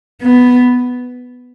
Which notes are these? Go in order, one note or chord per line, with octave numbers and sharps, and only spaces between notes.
B3